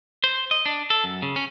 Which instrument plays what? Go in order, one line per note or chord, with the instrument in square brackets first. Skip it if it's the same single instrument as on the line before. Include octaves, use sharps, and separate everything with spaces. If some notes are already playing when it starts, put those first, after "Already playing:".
[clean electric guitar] C5
D#5
D4
A4
F#2
C#3
C#4